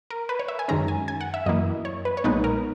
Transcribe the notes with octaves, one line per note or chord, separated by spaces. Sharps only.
A#4
B4
C#5
E5
G#5
F#2 D#3 G#3 C#4 A#5
G#5
G#5
F#5
E5
F#2 E3 A#3 E4 D#5
C#5
B4
C#5
B1 A#2 G#3 B3 D#4 B4
A#4